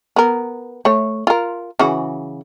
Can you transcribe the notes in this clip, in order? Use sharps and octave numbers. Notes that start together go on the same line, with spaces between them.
B3 A#4
A3 C#5
F4 A#4
C#3 E3 F#4